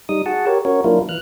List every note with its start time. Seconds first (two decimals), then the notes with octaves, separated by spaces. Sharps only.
0.09 G3 D#4 D#6
0.26 F#4 G#4 F#5 A5
0.47 G4 A#4 C#5
0.65 C#4 F#4 A#4 C#5
0.84 F#3 A#3 D4 E4 F4 A#4
1.09 E3 F6 F#6